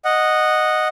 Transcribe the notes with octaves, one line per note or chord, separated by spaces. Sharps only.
D#5 F#5